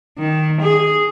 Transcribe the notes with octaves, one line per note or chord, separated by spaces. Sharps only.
D#3
G#4